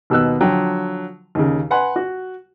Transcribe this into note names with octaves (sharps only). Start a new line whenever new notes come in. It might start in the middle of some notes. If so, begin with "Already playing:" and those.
D#2 B2 B3 E6 F#6
D3 F3 F#3 G5
D#2 C#3
B4 F#5 G#5 C6
F#4